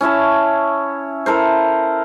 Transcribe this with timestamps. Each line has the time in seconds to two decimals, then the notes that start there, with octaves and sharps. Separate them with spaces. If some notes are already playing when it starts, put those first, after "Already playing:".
0.01 C#4 E4 C#5 A5
1.26 E4 A4 A#4 C5